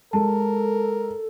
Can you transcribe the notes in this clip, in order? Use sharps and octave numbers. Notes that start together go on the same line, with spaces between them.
G#3 A4 A#4 A5